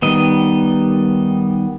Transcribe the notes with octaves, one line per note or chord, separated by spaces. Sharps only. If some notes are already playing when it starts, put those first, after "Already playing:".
D#3 G3 B3 D#5